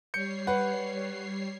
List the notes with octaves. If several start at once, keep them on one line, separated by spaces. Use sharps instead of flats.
G3 C#5 G6 C7 C#7
B4 F#5